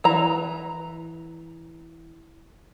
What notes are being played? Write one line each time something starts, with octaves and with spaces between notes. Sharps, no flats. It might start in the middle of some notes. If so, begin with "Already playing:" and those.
E3 A#5